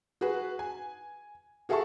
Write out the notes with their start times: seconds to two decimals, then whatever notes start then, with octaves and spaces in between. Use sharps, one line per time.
0.21 F#4 G#4 B4
0.59 G#5
1.69 F#4 G#4 A4 E5 A5 C#6